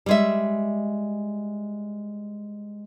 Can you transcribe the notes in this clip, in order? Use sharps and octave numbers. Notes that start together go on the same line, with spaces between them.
G3 G#3 E5